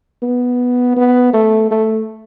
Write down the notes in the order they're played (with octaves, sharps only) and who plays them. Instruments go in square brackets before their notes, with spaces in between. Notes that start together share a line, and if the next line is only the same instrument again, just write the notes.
[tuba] B3
B3
A3
A3